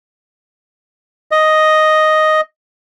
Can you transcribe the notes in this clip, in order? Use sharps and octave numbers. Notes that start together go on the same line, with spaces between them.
D#5